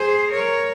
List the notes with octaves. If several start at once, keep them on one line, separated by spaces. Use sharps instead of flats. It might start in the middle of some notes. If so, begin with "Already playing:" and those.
Already playing: G#4 C5
A#4 C#5